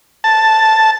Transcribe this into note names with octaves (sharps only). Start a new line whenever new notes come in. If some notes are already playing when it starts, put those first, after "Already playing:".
A5